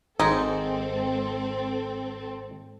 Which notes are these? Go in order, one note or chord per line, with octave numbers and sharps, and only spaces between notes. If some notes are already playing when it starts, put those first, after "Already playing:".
G#1 G#2 C4 D#4 A4 D#5